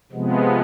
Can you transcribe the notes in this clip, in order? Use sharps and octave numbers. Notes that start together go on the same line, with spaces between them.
C3 F3 G#3 B3